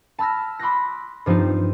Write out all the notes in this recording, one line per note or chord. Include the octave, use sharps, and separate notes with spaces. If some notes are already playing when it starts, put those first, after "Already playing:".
A5 B5 E6 F6 A#6
B5 C6 D6 E6 F#6 A#6
G2 F3 C4 D#4 F4